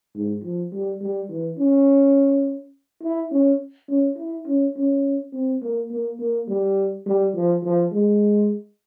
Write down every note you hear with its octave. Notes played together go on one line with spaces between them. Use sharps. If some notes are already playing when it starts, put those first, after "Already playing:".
G#2
F3
G3
G3
E3
C#4
E4
C#4
C#4
E4
C#4
C#4
C4
A#3
A#3
A#3
G3
G3
F3
F3
G#3